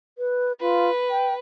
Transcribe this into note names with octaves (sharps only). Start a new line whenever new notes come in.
B4
F4 B4
G5